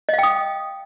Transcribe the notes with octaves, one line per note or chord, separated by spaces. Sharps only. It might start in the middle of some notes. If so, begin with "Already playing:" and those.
D#5 F5 G5 D#6